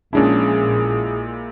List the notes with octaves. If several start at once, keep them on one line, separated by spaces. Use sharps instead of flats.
A#1 A#2 G#3 C#4 D4 E4 G#4